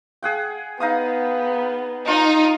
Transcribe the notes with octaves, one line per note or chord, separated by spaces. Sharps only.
G#4 F#5 G5
B3 D#4 F5 D#6
D#4 F4